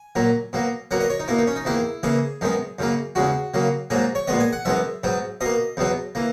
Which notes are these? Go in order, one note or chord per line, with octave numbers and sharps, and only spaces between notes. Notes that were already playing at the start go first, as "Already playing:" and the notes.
Already playing: G#5
A#2 F#3 A#3
B2 F#3 A#3
B2 F#3 A#3 F#5
D#5
C#5
D#4
B2 A#3 E4
D#4
C#4
D#4
E2 D#3 A#3 E4
C#3 E3 A#3 G#4
F#2 D#3 G#3 B3
F#2 C#3 F#3 A#3
E2 C#3 G#3 F#4
C#3 F#3 A#3
G#2 F#3 A#3 G#4
C#5
A#2 G#3 B3 D#5
G#5
F#5
F#2 E3 G#3 B3 E5
G#2 F#3 B3
B2 A#3 D#5
E2 B2 F#3 B3
E3 A#3